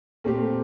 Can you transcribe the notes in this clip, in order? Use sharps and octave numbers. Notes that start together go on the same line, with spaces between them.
A#2 A3 C4 G4